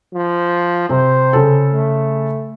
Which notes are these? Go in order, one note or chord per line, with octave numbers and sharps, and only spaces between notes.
F3
C3 C4 C5
C#3 A4
A3